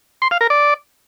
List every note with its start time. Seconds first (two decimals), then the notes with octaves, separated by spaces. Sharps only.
0.22 C6
0.31 F5
0.41 A#4
0.50 D5